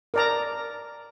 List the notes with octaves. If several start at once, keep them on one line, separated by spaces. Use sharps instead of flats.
A#4 D5 A#5